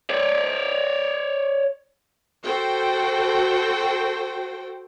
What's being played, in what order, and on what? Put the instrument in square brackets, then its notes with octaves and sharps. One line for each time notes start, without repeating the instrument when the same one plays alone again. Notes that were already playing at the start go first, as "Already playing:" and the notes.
[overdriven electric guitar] C#5 D5
[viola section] F#4 A4 C5 G5